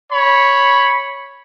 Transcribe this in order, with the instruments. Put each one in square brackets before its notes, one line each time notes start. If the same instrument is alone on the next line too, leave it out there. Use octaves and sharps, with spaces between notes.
[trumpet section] C#5 B5